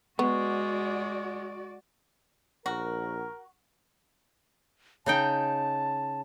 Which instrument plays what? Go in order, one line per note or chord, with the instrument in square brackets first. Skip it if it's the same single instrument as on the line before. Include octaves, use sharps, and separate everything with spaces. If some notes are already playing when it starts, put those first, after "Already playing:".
[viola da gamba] G#3 [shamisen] B3 [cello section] F#4 D5 [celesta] C#6
[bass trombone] A#1 [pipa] F#4 [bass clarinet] A#4
[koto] C#3 D#4 G5 [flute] A5